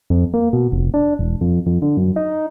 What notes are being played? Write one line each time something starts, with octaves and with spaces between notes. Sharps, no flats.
F2
A#3
B2
F1
D4
E1
F2
F2
D3
F#2
D#4